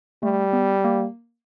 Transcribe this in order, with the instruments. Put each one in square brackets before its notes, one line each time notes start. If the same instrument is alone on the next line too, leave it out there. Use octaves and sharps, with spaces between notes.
[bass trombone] G3 [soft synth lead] A3
[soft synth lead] B3
A#3